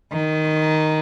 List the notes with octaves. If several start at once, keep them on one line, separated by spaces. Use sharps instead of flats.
D#3